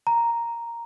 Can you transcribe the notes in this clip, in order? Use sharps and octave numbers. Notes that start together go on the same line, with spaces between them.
A#5